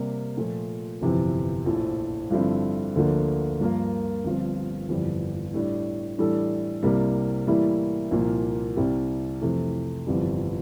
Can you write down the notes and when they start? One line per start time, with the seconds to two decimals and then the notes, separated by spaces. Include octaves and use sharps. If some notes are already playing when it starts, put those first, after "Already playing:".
Already playing: C3 G3 A#3
0.37 A#2 F3 A3
1.01 G1 F2 C3 E3
1.66 A#1 A2 F3
2.30 G2 D3 F3 C4 E4
2.96 D2 D3 F3 A#3
3.60 G2 F3 A#3 F4 A#4
4.24 G1 G2 F3 C4 F4
4.89 G1 F2 E3 G3
5.54 A2 G3 D4
6.18 A2 E3 G3 D4 A4
6.83 C2 C3 G3 A#3
7.47 A2 E3 G3 A#3 E4
8.11 C2 A#2 F3 A#3
8.76 C2 C3 G3 C4 G4
9.41 F2 C3 E3 A3
10.06 G1 F2 C3 E3 G3